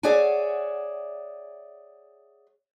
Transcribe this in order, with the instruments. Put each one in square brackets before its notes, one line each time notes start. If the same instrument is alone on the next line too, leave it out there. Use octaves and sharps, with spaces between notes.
[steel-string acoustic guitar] G#4 C#5 D5 E5 F#5 G#5